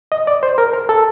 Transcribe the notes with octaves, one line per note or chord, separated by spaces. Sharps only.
D#5
D5
C5
A#4
A#4
A4